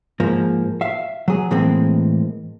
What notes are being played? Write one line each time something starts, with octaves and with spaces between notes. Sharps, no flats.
G#2 F3 A#3
E5 F5
F#3 G#4
A2 E3 G#3 A#3 C4